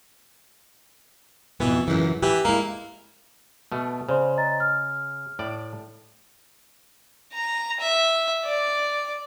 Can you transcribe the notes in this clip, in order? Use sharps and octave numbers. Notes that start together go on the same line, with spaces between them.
F2 B2 E3 B3
C#2 F#2 E3
E3 G4
G#3 A#3 E4
B2 A3
C#3 C5 D5 C6
D#5 A#5 A6
F6
A2 D5
A#5
E5
D5